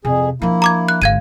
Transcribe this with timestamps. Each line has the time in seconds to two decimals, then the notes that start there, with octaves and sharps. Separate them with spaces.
0.05 F2 C3 G#4
0.42 F3 A#3 D4 E4
0.62 A#5 D6 G#6
0.89 F#6
1.02 G#1 D3 F5 G#6 D#7